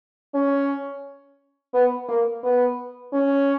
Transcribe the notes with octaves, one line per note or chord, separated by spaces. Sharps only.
C#4
B3
A#3
B3
C#4